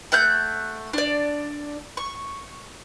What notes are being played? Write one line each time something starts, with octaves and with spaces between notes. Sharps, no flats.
A3 F#5 F#6 G6
D4 D5
C#6